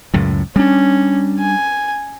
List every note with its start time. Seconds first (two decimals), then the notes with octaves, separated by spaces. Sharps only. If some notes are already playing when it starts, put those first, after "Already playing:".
0.14 C#2 F#2 A2
0.56 G3 C#4 D4
1.39 G#5